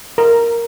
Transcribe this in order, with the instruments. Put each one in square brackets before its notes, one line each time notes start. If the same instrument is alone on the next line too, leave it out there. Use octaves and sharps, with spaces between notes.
[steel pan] A#4